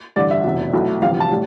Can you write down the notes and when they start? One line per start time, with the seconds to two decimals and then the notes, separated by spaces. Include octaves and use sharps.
0.16 A1 G2 D3 D5
0.31 E5
0.44 F1 E2 B2
0.74 B1 B2 A3 E4
1.02 G1 F2 C3 E3 F5
1.20 A5
1.31 A2 G3